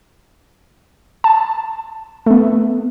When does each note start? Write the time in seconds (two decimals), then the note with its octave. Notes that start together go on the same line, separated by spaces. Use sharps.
1.24 A5
2.26 A3 B3